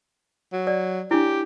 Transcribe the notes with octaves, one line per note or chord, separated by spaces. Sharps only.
F#3
D5
D4 E4 G4